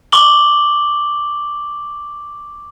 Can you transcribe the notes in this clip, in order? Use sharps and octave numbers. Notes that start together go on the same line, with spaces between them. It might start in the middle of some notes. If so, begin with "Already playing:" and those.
C#6 D6 F#7 G7